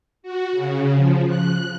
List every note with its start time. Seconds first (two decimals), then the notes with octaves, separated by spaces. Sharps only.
0.23 F#4
0.53 C#3
0.95 F3
1.27 F#6